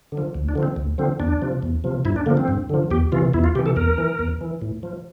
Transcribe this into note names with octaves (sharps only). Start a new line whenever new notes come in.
D3
F3
D2
D4
D3 F3
C4
D2
D3 F3 C4
E2 D4
C3 F3
E2
C3 F3
G2 E4
D4
D3 F3 A#3
C4
G2
D3 F3
E2 G4
C3 E3 F4
E2 E4
F4
C3 E3 G4
A4
E2 A#4
E3
E2
E3
A2
F3